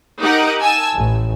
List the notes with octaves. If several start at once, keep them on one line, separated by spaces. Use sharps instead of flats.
D#4 G4 A#4 F#5 D6
G#5 A5 E6
A1